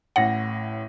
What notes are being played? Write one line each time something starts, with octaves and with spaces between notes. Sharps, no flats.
A1 A2 F#5 A#6